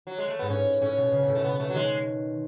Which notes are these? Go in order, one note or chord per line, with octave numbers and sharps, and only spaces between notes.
F#3
G#3
A3
G#2 B3
A2 C#4
A2 C#4
B2
C#3
B2
A2
A3
B2 B3
A3
F#3
D#3 G#3